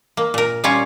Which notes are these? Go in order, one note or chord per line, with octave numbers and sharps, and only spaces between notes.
A#3
A#2 A#4
G3 C#4 F4 C#5